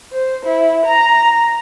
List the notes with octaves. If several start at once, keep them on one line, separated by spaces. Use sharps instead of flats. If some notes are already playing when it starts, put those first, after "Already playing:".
C5
E4
A#5